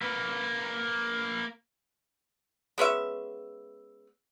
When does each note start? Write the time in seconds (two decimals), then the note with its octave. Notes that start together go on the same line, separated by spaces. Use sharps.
0.02 A#3 B4
2.78 G#3 B3 C#4 E5